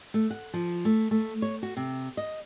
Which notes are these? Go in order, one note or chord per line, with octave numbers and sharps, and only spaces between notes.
A3
F#5
F3
A3
A3
C#5
F#4
C3
D#5